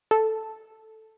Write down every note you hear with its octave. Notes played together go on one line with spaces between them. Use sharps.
A4